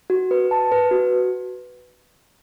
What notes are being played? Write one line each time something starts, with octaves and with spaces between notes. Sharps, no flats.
F#4
B4
A5
B4
F#4